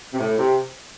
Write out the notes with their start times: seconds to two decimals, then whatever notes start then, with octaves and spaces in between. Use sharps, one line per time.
0.13 C3
0.20 A2
0.38 C3